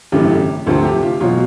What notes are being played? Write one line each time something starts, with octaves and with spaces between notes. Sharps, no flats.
G#1 F#2 C#3 E3 A3 G4
D2 C3 F3 A3 C4 A4
G4
F4
E2 B2 F#3 F4